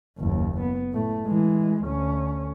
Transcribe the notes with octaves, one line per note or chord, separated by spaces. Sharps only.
F#1 D#2
B3
A2 A3
E3 G#3
D2 C#4